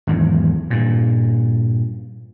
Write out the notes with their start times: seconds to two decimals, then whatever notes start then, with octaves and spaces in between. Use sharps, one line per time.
0.07 G#1 E2 G#2
0.70 G2 A#2